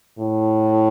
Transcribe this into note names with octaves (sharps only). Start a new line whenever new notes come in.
A2